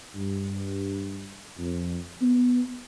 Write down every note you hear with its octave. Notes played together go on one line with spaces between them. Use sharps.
G2
F2
B3